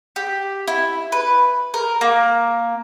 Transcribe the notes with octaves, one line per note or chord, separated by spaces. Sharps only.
G4
E4
B4
A#4
A#3